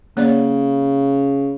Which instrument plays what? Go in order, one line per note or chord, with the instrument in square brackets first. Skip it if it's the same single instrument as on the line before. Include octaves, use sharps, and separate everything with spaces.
[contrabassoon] C#3 [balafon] A#3 C#5 D5